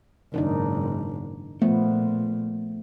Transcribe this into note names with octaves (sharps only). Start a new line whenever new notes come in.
F#1 G#2 D#3 D4 D#4
A#2 F3 A3 B3